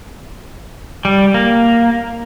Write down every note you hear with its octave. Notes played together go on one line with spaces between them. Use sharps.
G3
A#3